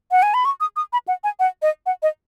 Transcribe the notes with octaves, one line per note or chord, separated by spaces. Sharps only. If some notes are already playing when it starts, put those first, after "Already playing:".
F#5
G#5
B5
C#6
D#6
D#6
B5
F#5
G#5
F#5
D#5
F#5
D#5